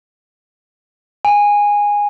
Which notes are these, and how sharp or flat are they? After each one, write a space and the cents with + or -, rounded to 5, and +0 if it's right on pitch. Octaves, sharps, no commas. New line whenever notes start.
G#5 -15